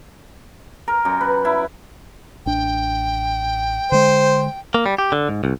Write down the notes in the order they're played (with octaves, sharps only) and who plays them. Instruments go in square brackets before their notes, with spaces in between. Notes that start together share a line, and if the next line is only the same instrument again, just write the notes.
[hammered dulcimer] A#4
F#2
B4
E4
[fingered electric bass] A1 D4 [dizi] G5
[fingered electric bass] D3 G#3 [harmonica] C5
[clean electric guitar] A#3
G3
G4
D3
G#2
C2